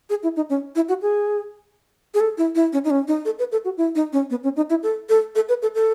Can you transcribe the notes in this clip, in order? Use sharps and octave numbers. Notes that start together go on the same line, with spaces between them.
G#4
E4
D#4
C#4
E4
F#4
G#4
G#4
A4
E4
E4
C#4
D#4
C#4
D#4
A4
B4
A4
F#4
E4
D#4
C#4
B3
C#4
D#4
E4
A4
A4
A4
B4
A4
A4